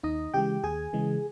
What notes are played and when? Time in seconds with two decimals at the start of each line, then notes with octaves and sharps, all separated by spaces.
0.03 D#2 D#4 D#5
0.34 C#3 E3 G#3 G4 G5
0.64 D#2 G#4 G#5
0.93 C#3 E3 G#3